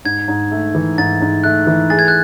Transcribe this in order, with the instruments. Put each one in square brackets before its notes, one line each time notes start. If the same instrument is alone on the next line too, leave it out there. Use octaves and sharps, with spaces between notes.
[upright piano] G#2 [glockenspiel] G#6
[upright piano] G#2
A3
E3
[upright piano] G#2 [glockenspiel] A6
[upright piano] G#2
[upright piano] A3 [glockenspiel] F#6
[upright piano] E3
[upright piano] G#4 [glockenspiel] A6
[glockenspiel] G#6
F#6